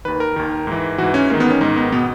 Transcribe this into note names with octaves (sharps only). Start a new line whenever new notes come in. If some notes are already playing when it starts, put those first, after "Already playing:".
D#2 D#3 B4
A#4
D#2 D#3
G#2 E3
G#2 E3 F#4
C#4
G#2 D#3 A#3
B3
C#4
G#2 D#3 D#4
B3
B2 B3